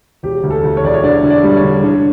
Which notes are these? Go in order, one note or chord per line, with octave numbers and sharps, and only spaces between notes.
E1 G4
D2
A4
D2
C#5
E1 D5
C#5
D3 D5
D3
D5
G3
C#5
D3
D3